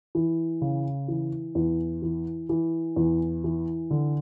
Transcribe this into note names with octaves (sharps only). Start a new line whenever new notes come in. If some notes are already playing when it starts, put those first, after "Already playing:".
E3
C#3
E3
E2
E3
E3
E2
E3
D3